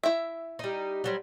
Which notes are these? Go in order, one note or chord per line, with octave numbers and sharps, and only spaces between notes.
E4 E5
G3 D#4
F#3 G3 C4